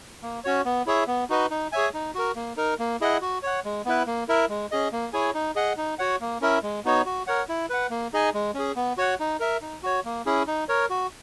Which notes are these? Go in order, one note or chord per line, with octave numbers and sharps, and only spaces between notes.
A#3
C#4 F#4 C#5
B3
E4 G#4 C#5 E5
B3
D#4 F#4 B4 D#5
D#4
G#4 C#5 E5 G#5
D#4
F#4 A#4
A#3
D#4 A#4
A#3
E4 G#4 D#5 F#5
F#4
C#5 F#5
G#3
B3 E4 B4
A#3
E4 A#4 E5
G#3
C#4 G#4 D#5
A#3
E4 G#4 C#5 G#5
D#4
G#4 D#5 F#5
D#4
F#4 C#5 F#5
A#3
C#4 E4 A#4 E5
G#3
B3 D#4 F#4 C#5
F#4
A#4 C#5 F#5
E4
B4 F#5
A#3
D#4 G#4 D#5 G#5
G#3
C#4 G#4
B3
F#4 C#5 F#5
D#4
A#4 E5
D#4
F#4 C#5
A#3
C#4 E4 G#4
D#4
A#4 C#5
F#4